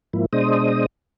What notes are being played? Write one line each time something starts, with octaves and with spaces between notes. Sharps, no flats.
G#2 F3 A#3 E4
B2 G#3 D4 C5 D#5 D#6